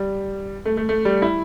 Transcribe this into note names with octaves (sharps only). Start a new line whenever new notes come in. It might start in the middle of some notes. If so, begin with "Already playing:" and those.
Already playing: G3
A3
A3
A3
G3
E4